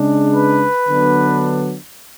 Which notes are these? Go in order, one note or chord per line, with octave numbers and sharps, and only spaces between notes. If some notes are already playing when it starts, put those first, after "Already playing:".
Already playing: C#3 G#3 D4
B4
D3 F#3 B3 D4